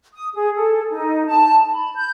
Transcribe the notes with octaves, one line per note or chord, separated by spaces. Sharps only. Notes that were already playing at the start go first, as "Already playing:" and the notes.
D#6
G#4
A4
D#4
A5
B5
G6